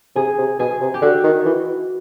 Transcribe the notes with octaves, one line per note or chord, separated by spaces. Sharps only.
C3 G#4
C3
B2 G#4
C3
G4
D3 F#4
D#3
E3